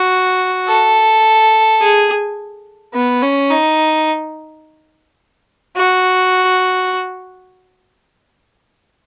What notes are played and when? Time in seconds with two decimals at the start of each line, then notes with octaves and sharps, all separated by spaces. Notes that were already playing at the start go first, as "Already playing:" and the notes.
Already playing: F#4
0.68 A4
1.81 G#4
2.94 B3
3.22 C#4
3.50 D#4
5.77 F#4